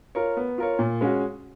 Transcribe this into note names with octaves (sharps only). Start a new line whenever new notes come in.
F4 A#4 C#5
B3
F4 A#4 C#5
A#2
G#3 C#4 F#4